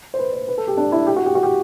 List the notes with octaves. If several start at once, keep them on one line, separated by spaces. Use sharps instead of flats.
C5
B4
C5
B4
A4
G4
D4
E4
G4
F#4
G4
F#4
G4